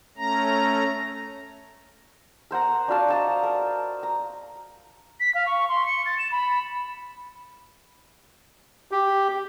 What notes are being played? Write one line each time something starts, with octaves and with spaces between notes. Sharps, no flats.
A3 C#4 A#5
A#4 C5 F#5 A#5
D4 F#4 F5 A5
D#5 A5 A#5
A#4
A#5
B6
F5
C#6
C6
C#7
A6
E7
B5
G4